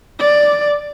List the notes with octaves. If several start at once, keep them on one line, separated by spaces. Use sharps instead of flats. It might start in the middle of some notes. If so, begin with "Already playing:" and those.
D5